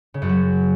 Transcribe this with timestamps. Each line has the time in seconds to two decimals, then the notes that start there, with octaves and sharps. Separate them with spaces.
0.14 C#3
0.22 F#2
0.29 F#3